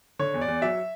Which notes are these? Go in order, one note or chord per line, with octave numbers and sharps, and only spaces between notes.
D3 C#5
E2
D5
E2
F#3 E5